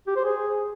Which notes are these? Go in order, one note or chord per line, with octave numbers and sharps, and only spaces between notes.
G4
C5
G#4